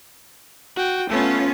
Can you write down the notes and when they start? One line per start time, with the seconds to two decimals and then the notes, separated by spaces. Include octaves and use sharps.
0.77 F#4 G5
1.10 A3 B3 C#4 F4